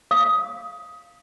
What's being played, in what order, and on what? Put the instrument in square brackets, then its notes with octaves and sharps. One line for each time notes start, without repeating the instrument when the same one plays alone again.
[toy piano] F5 D#6